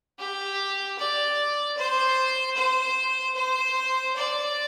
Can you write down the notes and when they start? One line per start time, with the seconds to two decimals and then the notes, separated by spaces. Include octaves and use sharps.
0.19 G4
0.99 D5
1.77 C5
2.57 C5
3.36 C5
4.16 D5